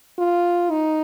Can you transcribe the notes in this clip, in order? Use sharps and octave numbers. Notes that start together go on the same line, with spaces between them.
F4
D#4